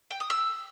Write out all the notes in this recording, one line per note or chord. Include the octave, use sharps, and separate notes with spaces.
G5
D#6
E6